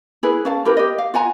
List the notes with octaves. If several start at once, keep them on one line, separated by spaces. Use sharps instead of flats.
E4 G#4 B4
C#4 F5 A5
E4 G4 A#4 B4
G4 D#5
F5
F4 F#5 G#5 A#5